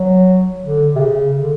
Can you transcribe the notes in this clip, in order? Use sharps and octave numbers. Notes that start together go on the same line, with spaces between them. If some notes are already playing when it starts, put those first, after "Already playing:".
Already playing: F#3
D3
C3
C#3
D3